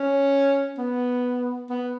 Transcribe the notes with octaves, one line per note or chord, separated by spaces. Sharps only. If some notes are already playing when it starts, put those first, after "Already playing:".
Already playing: C#4
B3
B3